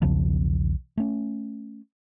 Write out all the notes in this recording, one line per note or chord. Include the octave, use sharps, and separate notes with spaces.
B1 E2 C#3 F3
A3 C#4